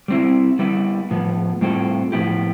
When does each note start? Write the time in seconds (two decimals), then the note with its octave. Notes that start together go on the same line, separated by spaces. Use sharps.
0.08 G3 C4 E4
0.59 G3 B3 E4
1.11 A2 F3 B3
1.61 A2 G3 C4 F4 A4
2.12 A2 F3 B3 E4 G4